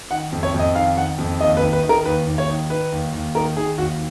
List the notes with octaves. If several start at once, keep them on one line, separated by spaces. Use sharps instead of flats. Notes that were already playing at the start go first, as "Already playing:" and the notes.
D#3 F#5
F2
C#5
F2 D#5
D#3 F5
D#3 F#5
F2
D#2 D#5
B4
D#3
B4
D#3
A#4
D#2 B4
D#2
C#5
D#3
D#3 B4
D#2
D#2
D#3 A#4
D#3 G#4
D#2 F#4